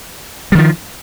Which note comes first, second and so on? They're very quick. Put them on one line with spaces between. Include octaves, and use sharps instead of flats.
G3 D#3 F3